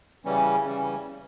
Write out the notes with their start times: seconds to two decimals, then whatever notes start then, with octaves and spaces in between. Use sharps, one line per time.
0.25 C#3 E3 G3 C#4
0.64 C#3 E3 G3 C#4